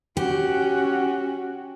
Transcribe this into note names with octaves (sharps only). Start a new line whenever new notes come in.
C#4 F#4 G4